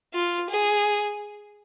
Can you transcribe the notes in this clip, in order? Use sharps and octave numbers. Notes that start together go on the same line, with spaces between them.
F4
G#4